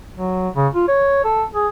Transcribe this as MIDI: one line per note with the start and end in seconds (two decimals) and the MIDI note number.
0.15 0.49 54
0.55 0.67 49
0.74 0.86 65
0.88 1.21 73
1.24 1.44 69
1.55 1.68 68